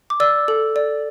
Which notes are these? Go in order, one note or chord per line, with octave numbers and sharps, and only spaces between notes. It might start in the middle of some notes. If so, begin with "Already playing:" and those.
D6
D5 E6
A4
D5